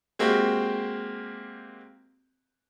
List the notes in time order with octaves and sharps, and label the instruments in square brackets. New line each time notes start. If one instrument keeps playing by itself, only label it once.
[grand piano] G#3 A#3 C4 F#4 G4